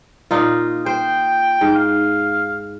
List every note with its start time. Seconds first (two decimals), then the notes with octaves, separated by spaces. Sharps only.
0.31 A#2 D#4 F4
0.86 C5 G5
1.61 G#2
1.75 F5